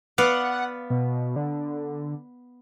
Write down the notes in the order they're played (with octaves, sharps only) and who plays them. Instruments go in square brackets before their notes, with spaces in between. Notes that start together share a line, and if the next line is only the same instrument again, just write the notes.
[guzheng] B3 D5 F5 [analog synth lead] F#5
[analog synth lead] B2
D3